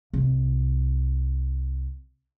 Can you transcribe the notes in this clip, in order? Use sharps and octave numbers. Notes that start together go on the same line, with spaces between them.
C2 F4